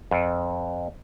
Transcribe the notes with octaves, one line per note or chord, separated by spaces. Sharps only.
F2